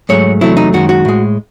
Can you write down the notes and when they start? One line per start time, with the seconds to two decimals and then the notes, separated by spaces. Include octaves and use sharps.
0.09 G#2 F#3 A3 C#5
0.41 E2 C3 F#3 A3 E4
0.57 D#4
0.73 F#2 D#3 G#3 F#4
0.89 F#4
1.05 A2 G#3